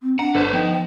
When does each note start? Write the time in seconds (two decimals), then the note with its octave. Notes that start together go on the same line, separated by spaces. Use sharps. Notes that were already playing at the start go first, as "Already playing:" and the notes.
0.03 C4
0.19 D4 F#5 A#5
0.35 G1 D3 B4 C5
0.53 F3 B3 D#4 G5
0.72 G5